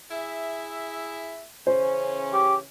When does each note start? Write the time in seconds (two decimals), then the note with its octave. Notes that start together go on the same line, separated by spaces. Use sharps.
0.10 E4 G#4 E5
1.67 C#3 E3 C#4 C5
2.33 G4